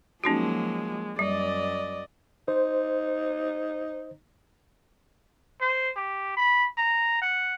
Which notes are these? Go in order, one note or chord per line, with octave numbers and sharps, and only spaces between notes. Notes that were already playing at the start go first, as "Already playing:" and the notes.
F3 F#3 G#3 A#3 C#4 D#4 F#4
F#2 G3 D5 D#5
D#4 C5
C5
G4
B5
A#5
F#5